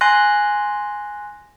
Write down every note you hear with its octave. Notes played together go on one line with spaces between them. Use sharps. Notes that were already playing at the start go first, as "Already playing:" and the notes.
G#5 C6 F#6 A#6